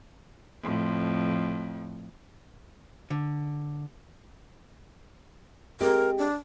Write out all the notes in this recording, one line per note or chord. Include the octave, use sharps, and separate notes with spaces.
F2 A2
D3
G#3 C4 G4 A#4
D4